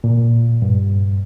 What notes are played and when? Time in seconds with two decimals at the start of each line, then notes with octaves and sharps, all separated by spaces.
0.04 A#2
0.62 G2